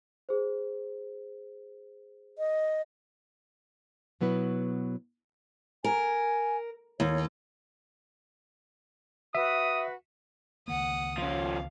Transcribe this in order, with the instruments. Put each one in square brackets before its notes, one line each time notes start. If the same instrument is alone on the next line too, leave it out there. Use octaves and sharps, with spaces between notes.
[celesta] G#4 C5
[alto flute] D#5
[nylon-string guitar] B2 F#3 B3 E4 B4
[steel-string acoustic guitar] A#4 [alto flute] G#5
[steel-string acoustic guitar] D#2 [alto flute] C#5
[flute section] F#4 B4 [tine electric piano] E5 [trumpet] D#6
[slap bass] C#2 D#3 A#3 [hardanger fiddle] F#5 D#6
[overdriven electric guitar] F3 C#4 [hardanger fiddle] F5